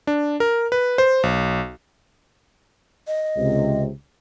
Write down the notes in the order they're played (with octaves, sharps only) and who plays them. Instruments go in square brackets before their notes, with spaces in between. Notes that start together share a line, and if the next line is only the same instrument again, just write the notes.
[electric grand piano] D4
A#4
B4
C5
B1
[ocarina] D#5
[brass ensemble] C#2 C3